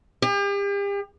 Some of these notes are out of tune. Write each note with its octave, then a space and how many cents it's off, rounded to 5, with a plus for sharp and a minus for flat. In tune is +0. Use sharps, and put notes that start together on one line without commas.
G4 +40